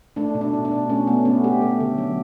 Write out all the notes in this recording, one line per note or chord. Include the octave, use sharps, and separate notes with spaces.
A3 D4
B2
D4
B2
D4
B2
A3 C#4
A3 B3
A3 C#4
A3 G4
A3
D3
F#3